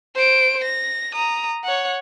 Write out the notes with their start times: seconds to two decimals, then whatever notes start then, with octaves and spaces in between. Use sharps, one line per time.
0.16 C5 D7
0.64 A#6
1.14 A#5 D#6
1.64 C#5 F#5